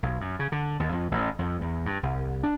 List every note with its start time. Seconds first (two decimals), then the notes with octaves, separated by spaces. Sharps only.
0.03 B1
0.21 F#2
0.39 C#3
0.52 D3
0.80 D#2
0.92 F2
1.11 A1
1.39 F2
1.61 E2
1.86 G2
2.03 C2
2.43 D4